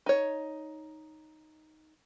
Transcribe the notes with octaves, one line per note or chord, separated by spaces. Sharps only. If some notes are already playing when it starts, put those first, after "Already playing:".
D#4 C#5